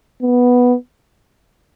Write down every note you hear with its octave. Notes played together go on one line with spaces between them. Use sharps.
B3